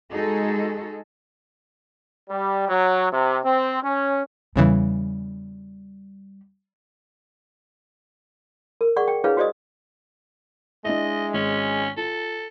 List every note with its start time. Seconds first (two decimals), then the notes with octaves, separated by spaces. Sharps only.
0.12 G#3 D#4 F#4 G#4 A4
2.30 G3
2.69 F#3
3.12 C3
3.44 C4
3.83 C#4
4.56 E2 C#3 E3 G3
8.81 A#4
8.96 G#4 D5 F#5 C#6
9.08 G5
9.24 D4 E4 G#4 B4 C#5 F5
9.37 F#4 G4 C5 D5 D#5 D#6
10.85 G#3 D4 E4 D#5
11.34 G#1 C#4
11.97 F4 A4